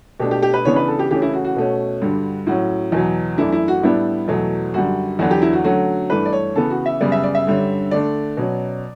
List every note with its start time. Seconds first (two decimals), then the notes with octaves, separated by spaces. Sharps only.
0.20 B2 A3 D4 G4
0.31 G4
0.42 G4
0.54 B4
0.65 C#3 E3 B3 D4 C#5
0.76 B4
0.88 A4
0.99 G4
1.11 C#3 E3 A3 C#4 G4
1.22 E4
1.33 F#4
1.45 F#4
1.56 B2 A3 C#4
2.01 G2 D3 G3
2.47 A2 F#3 C#4 F#4
2.92 E2 B2 F#3
3.38 F#2 E3 A3 D4 E4
3.52 E4
3.68 F#4
3.83 A2 G3 B3 D4 E4
4.28 E2 B2 F#3 A3
4.74 F#2 D3 G3 F#4
5.19 E2 D3 F#3 B3 D4 F#4
5.31 G4
5.42 E4
5.53 F#4
5.64 D3 F#3 A3 C#4 F#4
6.10 G2 E3 A3 D4 B4
6.26 D5
6.33 C#5
6.55 C#3 E3 B3 A4
6.70 F#4
6.86 E5
7.01 F#2 C#3 G3 B3 D5
7.12 E5
7.24 D5
7.35 E5
7.47 G2 D3 G3 C#4
7.91 D3 A3 D4 D5
8.37 B2 F#3 C#4